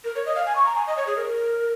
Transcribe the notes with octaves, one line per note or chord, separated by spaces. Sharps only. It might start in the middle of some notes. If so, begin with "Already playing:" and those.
A#4
C#5
D#5
F5
G#5
C#6
A#5
G#5
D#5
C#5
G#4
A#4